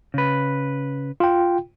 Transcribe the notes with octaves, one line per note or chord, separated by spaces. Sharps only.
C#3 B4
F4 G5